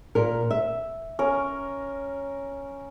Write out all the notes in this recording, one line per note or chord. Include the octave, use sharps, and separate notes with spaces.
A#2 A#4
E5
C#4 A#4